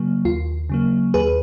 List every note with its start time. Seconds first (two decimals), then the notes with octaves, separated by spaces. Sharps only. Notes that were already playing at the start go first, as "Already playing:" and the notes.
Already playing: C#3 F#3 A#3
0.25 D#2 F4
0.69 C#3 F#3 A#3
1.14 D#2 G#4 B4